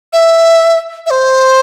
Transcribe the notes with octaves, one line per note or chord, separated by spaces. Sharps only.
E5
E5
C5